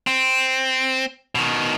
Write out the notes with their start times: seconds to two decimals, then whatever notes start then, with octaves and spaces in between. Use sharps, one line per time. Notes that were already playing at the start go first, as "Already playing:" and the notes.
0.07 C4
1.35 B2 D#3